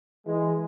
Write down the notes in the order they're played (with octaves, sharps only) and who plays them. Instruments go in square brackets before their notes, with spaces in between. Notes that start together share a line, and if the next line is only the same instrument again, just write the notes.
[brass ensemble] E3 G#3